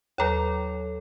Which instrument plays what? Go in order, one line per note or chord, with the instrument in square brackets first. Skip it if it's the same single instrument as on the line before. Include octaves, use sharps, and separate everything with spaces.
[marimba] D#2 A#5 [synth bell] F#3 A4 C#5